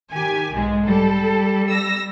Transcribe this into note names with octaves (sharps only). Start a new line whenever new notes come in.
D#3 G4 G#5
B1 G#2 G#3
G3 A4
E6 A#6